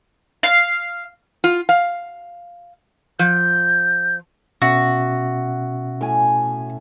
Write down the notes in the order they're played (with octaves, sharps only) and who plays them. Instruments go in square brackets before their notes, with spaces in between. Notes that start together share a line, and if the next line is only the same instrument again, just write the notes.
[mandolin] F5
[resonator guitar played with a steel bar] F4
F5
[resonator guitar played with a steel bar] F3 [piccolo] G6
[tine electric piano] B2 C#4 E5 [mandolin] F#4
[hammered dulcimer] A2 G#5